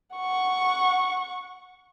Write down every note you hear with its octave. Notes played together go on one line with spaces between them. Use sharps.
F#5 C#6